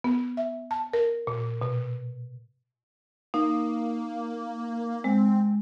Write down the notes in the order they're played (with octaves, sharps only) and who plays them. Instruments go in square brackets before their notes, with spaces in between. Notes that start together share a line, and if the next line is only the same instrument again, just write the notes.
[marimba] B3
E5
A5
A#4
A#2
B2
[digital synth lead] A#3 [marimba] D#4
[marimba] G#3 [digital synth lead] C4